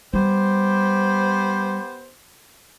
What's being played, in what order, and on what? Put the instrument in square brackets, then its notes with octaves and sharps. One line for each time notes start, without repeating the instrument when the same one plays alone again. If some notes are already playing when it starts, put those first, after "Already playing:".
[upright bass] G3 [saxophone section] B3 G4 C5